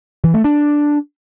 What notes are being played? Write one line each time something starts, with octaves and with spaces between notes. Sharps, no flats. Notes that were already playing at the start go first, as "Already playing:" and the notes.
E3
A3
D4